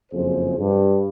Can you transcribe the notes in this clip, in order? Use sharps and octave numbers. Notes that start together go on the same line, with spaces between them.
F#1 F2 G#4 C5
G2